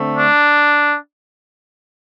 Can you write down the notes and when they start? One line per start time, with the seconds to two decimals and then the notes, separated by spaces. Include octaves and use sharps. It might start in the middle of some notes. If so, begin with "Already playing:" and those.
Already playing: D3 A3 C4
0.15 D4